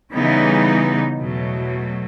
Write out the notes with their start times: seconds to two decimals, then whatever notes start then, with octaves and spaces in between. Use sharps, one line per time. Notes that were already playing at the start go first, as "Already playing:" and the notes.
0.14 C#3 E3 G3 B3 D#4
1.19 E2 B2 F#3 A3